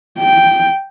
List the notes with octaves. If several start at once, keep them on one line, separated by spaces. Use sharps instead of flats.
G5